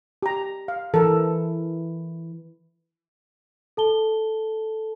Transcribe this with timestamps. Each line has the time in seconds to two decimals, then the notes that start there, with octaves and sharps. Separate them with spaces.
0.23 G4 A#5
0.68 F5
0.94 E3 A4 A#4
3.77 A4 A5 G7